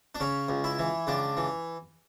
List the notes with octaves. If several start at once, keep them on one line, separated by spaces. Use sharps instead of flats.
D4
C#3 C#4
C#2
E4
E3
C#2 D4
E3